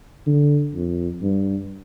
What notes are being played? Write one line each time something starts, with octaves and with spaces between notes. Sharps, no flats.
D3
F2
G2